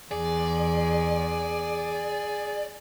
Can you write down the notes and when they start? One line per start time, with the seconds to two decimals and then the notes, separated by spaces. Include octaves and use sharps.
0.11 E2 G#4 D5